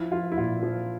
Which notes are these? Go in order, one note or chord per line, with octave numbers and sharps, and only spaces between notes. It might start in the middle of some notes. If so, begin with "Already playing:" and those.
Already playing: F3 E4
F3 F4
E4
A#2 F4
F3